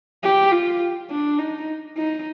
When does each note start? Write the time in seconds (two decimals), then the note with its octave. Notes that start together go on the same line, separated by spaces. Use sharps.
0.23 G4
0.51 F4
1.10 D4
1.39 D#4
1.97 D#4